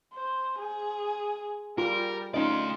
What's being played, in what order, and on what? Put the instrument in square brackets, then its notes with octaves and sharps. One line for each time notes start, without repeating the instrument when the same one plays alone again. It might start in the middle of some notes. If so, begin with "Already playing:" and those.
[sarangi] C5
G#4
[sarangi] G3 [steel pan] F4 [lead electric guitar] A#4
[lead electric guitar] A3 D5 [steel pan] C#4 D#4 D#5 [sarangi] F4